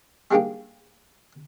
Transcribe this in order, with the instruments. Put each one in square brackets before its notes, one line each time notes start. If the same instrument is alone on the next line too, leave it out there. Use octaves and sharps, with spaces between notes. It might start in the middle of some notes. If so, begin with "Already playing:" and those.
[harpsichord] G3 G#3 A#3 D4 D#4 G4